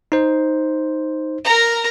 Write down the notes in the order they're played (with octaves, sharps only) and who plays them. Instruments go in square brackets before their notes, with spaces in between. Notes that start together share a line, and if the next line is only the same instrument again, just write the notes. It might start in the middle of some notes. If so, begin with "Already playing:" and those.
[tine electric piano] D#4 C5
[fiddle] A#4 A#5